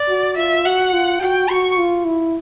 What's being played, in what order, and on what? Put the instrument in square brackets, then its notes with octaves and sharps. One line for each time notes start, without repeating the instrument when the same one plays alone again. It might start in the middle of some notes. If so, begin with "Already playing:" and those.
Already playing: [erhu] D5
[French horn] F#4
[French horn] F4 [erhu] E5
[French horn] F#4 [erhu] F#5
[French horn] F4
[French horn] F#4 [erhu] G5
[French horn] F#4 [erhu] C#6
[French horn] F4
E4